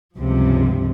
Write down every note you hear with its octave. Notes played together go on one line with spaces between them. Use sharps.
C#2 G2 C3 F3